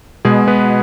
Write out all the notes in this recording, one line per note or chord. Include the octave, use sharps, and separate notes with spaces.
B2 G#3 G#4
B3 B4